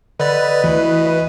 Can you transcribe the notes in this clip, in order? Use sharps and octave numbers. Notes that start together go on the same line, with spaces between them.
D3 B4 D5 D#5
D2 E3